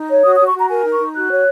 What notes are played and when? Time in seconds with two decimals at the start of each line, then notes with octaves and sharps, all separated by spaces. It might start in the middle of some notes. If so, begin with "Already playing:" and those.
Already playing: D#4
0.09 C#5
0.24 F#4 D#6
0.36 D#6
0.40 F#4
0.47 C#6
0.54 F#4 A#5
0.70 A#4 G#5
0.84 D#4
0.92 C#6
1.00 D#4
1.15 F#4 F#6
1.30 C#5